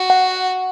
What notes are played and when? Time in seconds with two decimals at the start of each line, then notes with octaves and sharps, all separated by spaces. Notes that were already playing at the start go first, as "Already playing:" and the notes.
Already playing: F#4
0.10 F#5